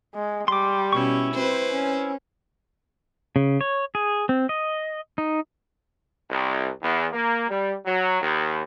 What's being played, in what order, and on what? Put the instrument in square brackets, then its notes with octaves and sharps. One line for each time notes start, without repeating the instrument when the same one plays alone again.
[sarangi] G#3
[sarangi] G3 [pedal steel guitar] C6 D6
[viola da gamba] B2 C#4 [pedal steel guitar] E4 C#6
[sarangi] C4 [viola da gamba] B4 C5
[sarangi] C#4
[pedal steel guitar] C#3
C#5
G#4
C4
D#5
D#4
[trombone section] C2
E2
A#3
G3
F#3
D#2